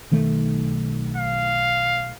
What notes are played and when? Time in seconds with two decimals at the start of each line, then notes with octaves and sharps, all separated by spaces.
0.11 B1 D#3 A3
1.17 F5